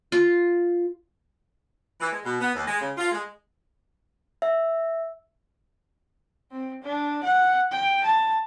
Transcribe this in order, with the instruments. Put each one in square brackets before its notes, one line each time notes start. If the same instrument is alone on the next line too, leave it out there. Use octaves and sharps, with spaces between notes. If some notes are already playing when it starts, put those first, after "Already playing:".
[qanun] F4
[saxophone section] E3
G#3
B2
B3
D#2
G#3
C#3
F4
G#3
[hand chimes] E5
[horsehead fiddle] C4
D4
F#5
G5
A5